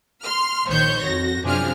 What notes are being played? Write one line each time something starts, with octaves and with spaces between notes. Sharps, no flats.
C6 F6
A#1 D#3 C5 C#5 G6
F2 F#4 A#6
F#2 C3 F3 D4 G#4 F6